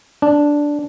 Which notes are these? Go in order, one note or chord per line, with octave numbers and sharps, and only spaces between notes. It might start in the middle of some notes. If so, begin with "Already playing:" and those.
D4